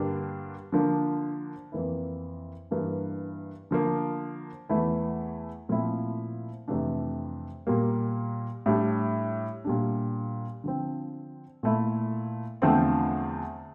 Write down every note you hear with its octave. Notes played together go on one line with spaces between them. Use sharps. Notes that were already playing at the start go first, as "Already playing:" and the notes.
Already playing: G2 D3 G3 A#3 D4
D3 F3 A#3 D4
F2 E3 A#3 E4
G2 E3 A#3 D4
D3 F3 A#3
E2 E3 A3 E4
A#2 F3 A3 C4 E4
F2 C3 E3 A3 D4
A#2 G3 A#3
A2 G3 D4
A#2 G3 D4
D3 F3 C4
A#2 A3 E4
E2 D3 F3 A3 C4